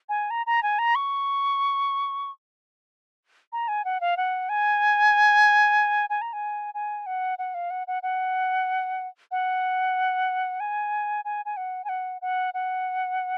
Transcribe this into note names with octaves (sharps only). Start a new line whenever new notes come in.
G#5
A#5
A#5
G#5
A#5
C#6
A#5
G#5
F#5
F5
F#5
G#5
G#5
A#5
G#5
G#5
F#5
F#5
F5
F#5
F#5
F#5
F#5
G#5
G#5
G#5
F#5
G#5
F#5
F#5
F#5